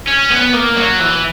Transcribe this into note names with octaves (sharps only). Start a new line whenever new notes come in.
C#4
B3
A#3
F#3
E3